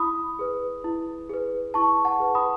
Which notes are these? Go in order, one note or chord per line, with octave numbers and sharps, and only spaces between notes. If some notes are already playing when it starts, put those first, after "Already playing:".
Already playing: E4 B5 D#6
G#4 B4
E4
G#4 B4
E4 A5 C#6
F#5 A5
G#4 B4
B5 D#6